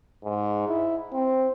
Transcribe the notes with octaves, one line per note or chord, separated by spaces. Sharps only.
G#2
E4
C4